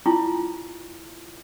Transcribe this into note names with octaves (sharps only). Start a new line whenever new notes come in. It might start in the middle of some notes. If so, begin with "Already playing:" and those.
E4 F4